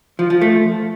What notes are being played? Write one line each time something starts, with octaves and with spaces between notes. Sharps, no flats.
F3
F3
A3